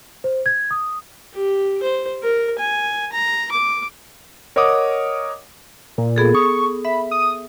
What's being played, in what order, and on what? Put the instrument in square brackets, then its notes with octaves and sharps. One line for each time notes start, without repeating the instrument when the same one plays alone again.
[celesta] C5
G#6
D#6
[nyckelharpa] G4
C5
A#4
G#5
A#5
D6
[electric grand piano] A#4 C#5 D#5 F#5 D6 D#6
[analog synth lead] A#2
[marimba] B3 G#4 A4
[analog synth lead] C#6 [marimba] D#6
[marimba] E5 [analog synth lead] B5
[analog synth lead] D#6